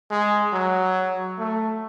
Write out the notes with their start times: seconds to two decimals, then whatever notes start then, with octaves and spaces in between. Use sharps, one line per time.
0.10 G#3
0.52 F#3
1.38 A3